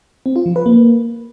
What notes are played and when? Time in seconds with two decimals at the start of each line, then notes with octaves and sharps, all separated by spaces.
0.26 C4
0.36 F4
0.46 F3
0.56 B4
0.66 A#3